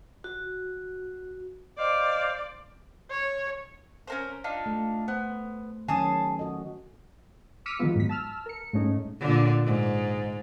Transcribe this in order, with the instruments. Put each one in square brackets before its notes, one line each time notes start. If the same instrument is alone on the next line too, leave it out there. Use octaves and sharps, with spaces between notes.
[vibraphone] F#4
[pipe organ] C5 F5 [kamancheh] D5 [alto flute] D#5
[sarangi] C#5
[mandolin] C#4 A#4 C5
D4 D#4 F4
[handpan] A3
[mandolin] B3 [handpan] C5
[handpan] D#3 F#3 C#4 [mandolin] G#4 A5 D#6
[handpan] F#4 A4 D#5
[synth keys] D6 E6 F6 B6 C#7 D#7
D#3 E3 F#3 G#3 B3 F4
G#2 B6
A5 E6 F6
A#4 C#7
G#2 A3 C#4 D#4
[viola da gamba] A#2 D3
G#2